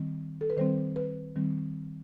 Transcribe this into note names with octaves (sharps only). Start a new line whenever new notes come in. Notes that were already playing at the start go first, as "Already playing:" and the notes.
Already playing: D#3 G3 C4
A4
B4
D#3 G3 C4 C5
B4
D#3 G3 C4